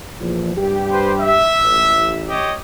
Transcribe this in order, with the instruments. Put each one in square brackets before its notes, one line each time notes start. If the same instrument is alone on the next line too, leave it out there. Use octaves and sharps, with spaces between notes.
[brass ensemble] E2 A#2 F3
G2 G4
[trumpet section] B4 C5
E5
[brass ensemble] A1
[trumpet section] G4 C#5 D#5